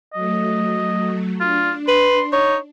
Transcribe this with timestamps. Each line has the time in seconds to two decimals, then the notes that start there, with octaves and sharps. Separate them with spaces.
0.14 F#3 A3 D#5
1.41 D4 F4
1.88 B4 C6
2.33 D#4 C#5